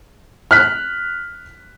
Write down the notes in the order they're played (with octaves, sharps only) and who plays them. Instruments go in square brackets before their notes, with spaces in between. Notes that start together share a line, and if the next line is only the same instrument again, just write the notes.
[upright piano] F6 F#6 B6